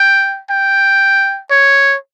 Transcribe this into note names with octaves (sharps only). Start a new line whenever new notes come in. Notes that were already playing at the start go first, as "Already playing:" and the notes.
Already playing: G5
G5
C#5